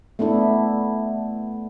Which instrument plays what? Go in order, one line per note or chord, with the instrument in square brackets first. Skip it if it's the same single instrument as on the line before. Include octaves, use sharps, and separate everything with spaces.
[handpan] A3 B3 D4 E4